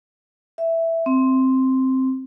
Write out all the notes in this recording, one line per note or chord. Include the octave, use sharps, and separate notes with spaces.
E5
C4